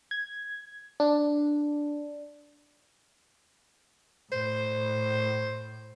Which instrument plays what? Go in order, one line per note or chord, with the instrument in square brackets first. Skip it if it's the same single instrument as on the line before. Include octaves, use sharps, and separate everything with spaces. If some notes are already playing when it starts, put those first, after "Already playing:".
[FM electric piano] G#6
D4
[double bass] A2 [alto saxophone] C5